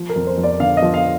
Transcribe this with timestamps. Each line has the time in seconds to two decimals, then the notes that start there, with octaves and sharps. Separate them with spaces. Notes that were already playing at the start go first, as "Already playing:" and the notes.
Already playing: F3
0.09 A#4
0.16 F2
0.27 C5
0.38 F2
0.44 D5
0.60 D3 F5
0.77 D#5
0.82 F3
0.94 F5